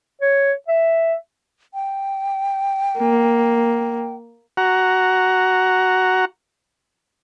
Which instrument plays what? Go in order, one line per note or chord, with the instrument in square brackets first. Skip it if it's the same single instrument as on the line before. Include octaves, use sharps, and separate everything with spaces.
[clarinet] C#5
E5
[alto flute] G5
[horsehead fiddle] A#3
[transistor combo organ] F#4 F#5 A#5